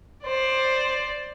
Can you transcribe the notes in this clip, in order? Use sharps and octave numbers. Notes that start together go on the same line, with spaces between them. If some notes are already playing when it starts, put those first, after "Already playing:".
C5 D5